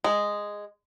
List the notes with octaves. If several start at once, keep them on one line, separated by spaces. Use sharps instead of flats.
G#3